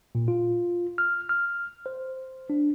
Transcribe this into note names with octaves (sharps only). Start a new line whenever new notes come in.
A#2
F4
F6
F6
C5
D4